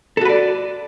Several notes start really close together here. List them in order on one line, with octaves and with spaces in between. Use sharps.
A4 F#4 B4 D5